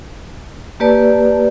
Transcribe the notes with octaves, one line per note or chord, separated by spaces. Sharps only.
A#3 G4 B4 D5 A5